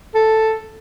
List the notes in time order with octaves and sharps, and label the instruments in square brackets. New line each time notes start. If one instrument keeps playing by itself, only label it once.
[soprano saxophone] A4